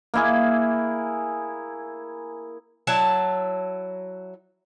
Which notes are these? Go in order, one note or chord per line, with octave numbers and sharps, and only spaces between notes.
A#3 E4 G#4
F#3 E4 A5